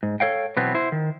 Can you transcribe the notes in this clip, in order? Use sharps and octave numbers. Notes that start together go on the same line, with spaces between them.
G#2
A4 C#5 F5 G5
B2 E3 F#3 B3 C4
E4 C5
D#3